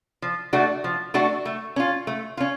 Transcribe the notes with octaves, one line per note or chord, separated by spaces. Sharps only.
F3
A3 D4 F#4
F3
A3 D4 F#4
A3
C#4 F4
A3
C#4 F4